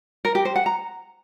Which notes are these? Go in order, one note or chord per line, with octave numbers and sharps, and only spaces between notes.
A#4
G4
C5
F#5
A#5